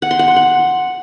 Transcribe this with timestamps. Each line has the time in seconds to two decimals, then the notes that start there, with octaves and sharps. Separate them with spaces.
0.02 F#5
0.11 C6
0.19 F#5
0.28 C6
0.36 F#5